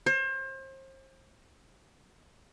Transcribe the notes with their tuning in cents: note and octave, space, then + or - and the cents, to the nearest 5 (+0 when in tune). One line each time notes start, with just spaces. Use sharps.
C5 +35